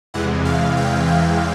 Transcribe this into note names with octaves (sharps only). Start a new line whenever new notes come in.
E2 C3 E3 G#3 F#5
F5
G5
G5